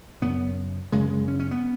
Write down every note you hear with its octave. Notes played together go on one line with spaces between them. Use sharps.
F#2 C#3 B3
F#2 C#3 G#3
G#3
C#4
C#4
B3